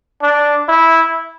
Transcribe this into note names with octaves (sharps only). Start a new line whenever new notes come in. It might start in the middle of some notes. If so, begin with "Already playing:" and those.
D4
E4